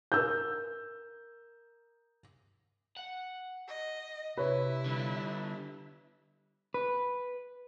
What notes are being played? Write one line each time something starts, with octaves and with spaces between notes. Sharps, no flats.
A#4 E6 G6
F#5
D#5
C3 E4 B4 C#5
D3 G3
B4